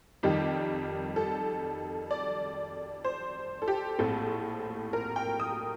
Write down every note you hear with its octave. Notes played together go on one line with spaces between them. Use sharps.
F2 D#3 G3 G4
A4
D5
C5
A4
G4
A#1 A2 A3 C4 A4
A#4
G5
D#6